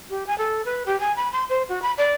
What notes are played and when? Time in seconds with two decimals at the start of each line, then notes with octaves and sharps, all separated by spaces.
0.10 G4
0.27 G#5
0.38 A4
0.65 B4
0.86 G4
1.00 G#5
1.16 B5
1.33 C6
1.49 C5
1.69 F#4
1.82 B5
1.98 D5